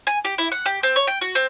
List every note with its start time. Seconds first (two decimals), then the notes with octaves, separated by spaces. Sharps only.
0.07 G#5
0.25 G4
0.38 E4
0.52 F#5
0.66 G4
0.83 C4
0.96 C#5
1.07 G5
1.21 F#4
1.35 C4